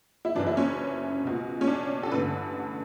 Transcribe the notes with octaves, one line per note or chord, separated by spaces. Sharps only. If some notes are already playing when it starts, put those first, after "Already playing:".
E4
F#1 F#2 E3 D4
E4
C#4
C#2 B2
C#4
D4
A4
A1 G2 D3 B4